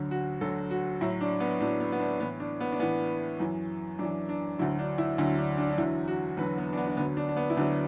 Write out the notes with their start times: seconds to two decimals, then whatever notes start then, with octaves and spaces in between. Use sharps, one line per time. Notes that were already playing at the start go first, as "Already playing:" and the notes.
Already playing: D2 D3 F#3
0.11 F#4
0.41 D2 D3 F#3 A4
0.71 F#4
1.01 A2 F#3 E4
1.21 D4
1.40 B3
1.61 A2 F#3 D4
1.80 B3
1.92 B3
2.00 D4
2.20 A2 E3 B3
2.40 D4
2.61 B3
2.72 D4
2.80 A2 E3 B3
3.40 F#2 E3
3.99 F#2 D4
4.03 E3
4.29 D4
4.59 D2 D3 F#3 E4
4.79 D4
4.98 E4
5.18 D2 D3 F#3 E4
5.38 D4
5.58 D4
5.70 D4
5.78 E2 D3 F#3 E4
6.08 F#4
6.37 E2 D3 F#3 B4
6.58 B3
6.73 D4
6.77 B3
6.87 D4
6.97 D2 D3 F#3 B3
7.17 D4
7.29 D4
7.37 B3
7.50 E4
7.57 D2 D3 F#3 D4